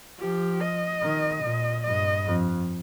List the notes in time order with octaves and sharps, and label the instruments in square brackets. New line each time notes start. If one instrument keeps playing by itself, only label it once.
[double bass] F3 [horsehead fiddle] G4
[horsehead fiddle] D#5
[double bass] D#3
A#2
[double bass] G2 [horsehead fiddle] D#5
[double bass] F2